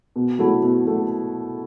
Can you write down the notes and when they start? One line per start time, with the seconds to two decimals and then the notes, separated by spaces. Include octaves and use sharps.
0.16 B2
0.39 F#3 A3 E4
0.62 B2
0.85 F#3 A3